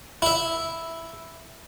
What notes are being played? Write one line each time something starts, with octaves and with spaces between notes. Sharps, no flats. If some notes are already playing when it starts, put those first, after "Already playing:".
E4 E5